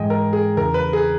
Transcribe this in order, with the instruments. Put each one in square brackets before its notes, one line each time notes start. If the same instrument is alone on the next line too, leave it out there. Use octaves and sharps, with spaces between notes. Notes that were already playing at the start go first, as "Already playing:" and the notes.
Already playing: [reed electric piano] G#2 E3 G#3 [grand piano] D#5 G5 G#5
[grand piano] A#4
G#4
[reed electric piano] E2 C#3 E3 [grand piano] A#4
[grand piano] B4
G#4